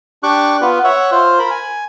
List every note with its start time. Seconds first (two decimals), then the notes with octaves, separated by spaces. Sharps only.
0.23 D4 G4 C#6 D6 F#6
0.62 B3 F4 B4
0.84 C#5 E5 F#5
1.12 F4 C5
1.39 A#4 B5
1.51 G#5